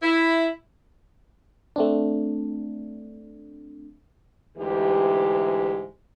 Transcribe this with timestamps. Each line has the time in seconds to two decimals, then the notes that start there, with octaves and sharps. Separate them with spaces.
0.02 E4
1.76 A3 C4 D4
4.58 D2 G#2 E3 G4